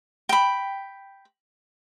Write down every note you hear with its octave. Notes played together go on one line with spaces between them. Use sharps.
G5 B5